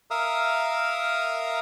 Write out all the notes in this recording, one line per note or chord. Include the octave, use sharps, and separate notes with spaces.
A#4 E5 F5 A#5 D#6